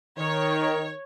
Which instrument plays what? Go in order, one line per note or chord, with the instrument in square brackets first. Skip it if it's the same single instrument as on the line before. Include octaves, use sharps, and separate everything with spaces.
[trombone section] D#3 [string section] C#5